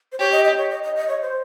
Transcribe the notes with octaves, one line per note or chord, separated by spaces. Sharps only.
C5
G4 C#5
D#5
D#5
C#5
D#5
D#5
D#5
C#5
C5